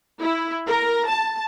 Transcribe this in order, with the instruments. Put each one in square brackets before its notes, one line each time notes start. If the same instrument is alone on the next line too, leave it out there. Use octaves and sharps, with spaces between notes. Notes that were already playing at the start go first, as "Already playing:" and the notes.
[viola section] E4
A#4
A5